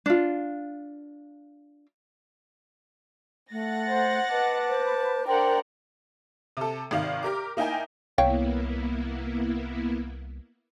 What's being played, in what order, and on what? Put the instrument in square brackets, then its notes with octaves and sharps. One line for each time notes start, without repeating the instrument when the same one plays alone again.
[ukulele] D4 F4
[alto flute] A3 [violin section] F#5 A6 A#6
[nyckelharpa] C5
[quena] B4 [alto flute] D#5 [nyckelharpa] A5 D6
[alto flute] C5
[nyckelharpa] D4 [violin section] A#4 D5 F#5 [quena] C5 [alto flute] G5
[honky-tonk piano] C3 A4
G#1 C3 D#3 F5
G4 A#4 D6
A#3 D#4 E4 G5 G#5
[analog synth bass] C2 [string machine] A#3 B3 E4 [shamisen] C#5 F5 G5